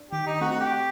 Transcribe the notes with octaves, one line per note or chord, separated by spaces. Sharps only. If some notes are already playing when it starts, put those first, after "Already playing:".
Already playing: D4
D#3 G4
D#4
A3 C4 F#4
F#4
G4